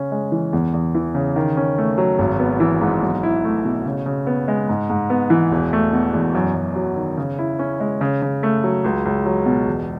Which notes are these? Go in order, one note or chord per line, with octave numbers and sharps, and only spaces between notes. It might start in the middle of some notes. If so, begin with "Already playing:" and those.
Already playing: C#3 C#4
G#3
E3
E2
E2
E3
C#3
D#3
C#4
A3
F#3
G#1
B3
E3
G#2
B1
E4
A3
B2
C#3
C#3
B3
G#3
G#2
G#2
B3
E3
E1
A3
B2
E2
F#2
F#2
F#3
D#3
C#3
E4
C#4
G#3
C#3
C#3
A3
F#3
C#2
C#2
F#3
B2
E1